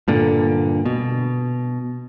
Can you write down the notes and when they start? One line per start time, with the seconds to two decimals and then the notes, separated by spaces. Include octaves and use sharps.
0.08 G2 A#2 D3
0.86 B2